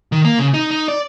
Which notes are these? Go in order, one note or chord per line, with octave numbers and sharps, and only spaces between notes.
D#3
A#3
C#3
D#4
D#4
D5